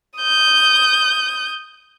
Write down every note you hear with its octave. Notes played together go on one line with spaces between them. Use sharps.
D#6 G6